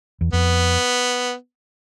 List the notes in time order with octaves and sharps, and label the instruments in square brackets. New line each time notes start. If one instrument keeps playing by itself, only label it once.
[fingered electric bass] E2
[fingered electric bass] F2 [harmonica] B3